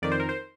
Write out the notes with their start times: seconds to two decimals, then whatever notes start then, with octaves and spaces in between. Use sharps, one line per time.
0.02 F2 D#3 D5
0.12 C5
0.20 A#4
0.29 C5